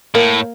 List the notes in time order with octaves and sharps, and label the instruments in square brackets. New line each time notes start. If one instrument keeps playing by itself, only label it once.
[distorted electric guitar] A2 [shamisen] A#3